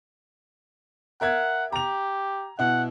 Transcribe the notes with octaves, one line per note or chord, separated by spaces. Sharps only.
A#4 E5 F#5 G#6
G4 A#5 F7
B2 E4 F#5